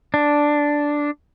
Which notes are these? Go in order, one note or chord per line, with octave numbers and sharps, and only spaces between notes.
D4